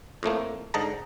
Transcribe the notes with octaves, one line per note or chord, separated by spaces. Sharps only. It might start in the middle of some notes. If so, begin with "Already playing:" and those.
F2 A2 A3 A#3
G#2 D3 D#5 A5 A#5